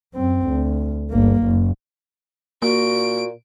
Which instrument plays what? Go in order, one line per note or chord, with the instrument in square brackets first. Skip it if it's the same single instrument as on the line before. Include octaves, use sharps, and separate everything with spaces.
[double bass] F#2 C4
D2
G1 A#3
F#1
[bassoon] A#2 [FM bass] A#3 [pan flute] F#4 [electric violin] D7